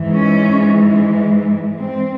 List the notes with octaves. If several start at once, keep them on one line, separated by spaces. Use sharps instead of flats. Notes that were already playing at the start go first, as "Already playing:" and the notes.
Already playing: G#2 E3 G#3
C#4
C4